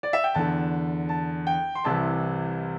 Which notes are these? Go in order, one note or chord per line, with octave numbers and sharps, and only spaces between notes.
D5
E5
G5
E2 D3 A5
A5
G5
C6
C2 C3 E3 A5